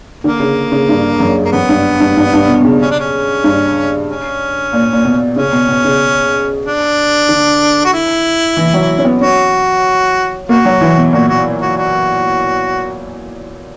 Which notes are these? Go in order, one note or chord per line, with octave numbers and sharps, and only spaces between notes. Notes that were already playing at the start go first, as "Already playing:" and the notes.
D3 A#3
C#3
C#3
G2
F#2
A#3
F#2 B3
G2
G2
G2
G2
B2
B2
C#3
C#4
D4
C#4
G2
C#4
A#2
A#2
B2
C#3 C#4
B2
B2
C#3
D4
D3
F#4
E4
E3
F#3
C#4
B3
C#4 F#4
A#3 F#4
F#3
E3
B2
A#2 F#4
F#4
F#4
F#4